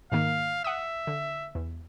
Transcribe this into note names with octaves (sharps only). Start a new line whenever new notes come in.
G#2 D#3 A#3 F5
E5 F#5 D#6
D3
E2